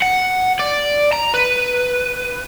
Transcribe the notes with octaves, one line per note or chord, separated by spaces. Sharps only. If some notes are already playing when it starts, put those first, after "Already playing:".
F#5
D5
A#5
B4